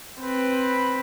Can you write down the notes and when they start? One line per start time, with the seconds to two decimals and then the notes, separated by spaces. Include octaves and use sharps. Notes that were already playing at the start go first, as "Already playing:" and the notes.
0.21 C4 B4